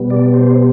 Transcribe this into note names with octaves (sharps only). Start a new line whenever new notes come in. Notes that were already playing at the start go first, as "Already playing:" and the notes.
Already playing: B2 G3 B3
D5
C5